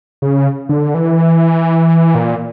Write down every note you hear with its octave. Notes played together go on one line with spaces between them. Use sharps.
C#3
D3
E3
A#2